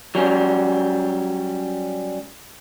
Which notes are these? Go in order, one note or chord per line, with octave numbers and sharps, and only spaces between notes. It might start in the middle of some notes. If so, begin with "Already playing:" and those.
F#3 G3 C#4